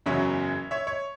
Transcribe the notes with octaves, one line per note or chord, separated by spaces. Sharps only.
F#1 E2 C#3 F#3 C#5 E5
C#5 E5
C#5